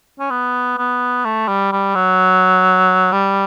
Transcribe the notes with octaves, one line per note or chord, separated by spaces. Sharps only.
C#4
B3
B3
A3
G3
G3
F#3
G3